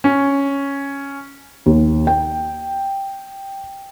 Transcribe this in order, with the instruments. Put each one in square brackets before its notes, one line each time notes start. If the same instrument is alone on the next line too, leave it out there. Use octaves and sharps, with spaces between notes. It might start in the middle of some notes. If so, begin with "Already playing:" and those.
[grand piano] C#4
[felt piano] D#2
G5